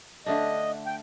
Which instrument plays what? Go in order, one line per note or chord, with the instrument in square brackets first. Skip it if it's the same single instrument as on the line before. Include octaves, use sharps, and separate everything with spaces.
[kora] D3 A3 D4 [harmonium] D#5
[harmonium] G5